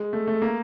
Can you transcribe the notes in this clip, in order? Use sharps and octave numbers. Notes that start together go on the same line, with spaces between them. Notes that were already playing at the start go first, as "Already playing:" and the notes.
Already playing: G#3
A3
A3
A#3